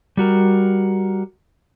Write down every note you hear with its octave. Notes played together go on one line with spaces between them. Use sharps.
G3 F#4 A#4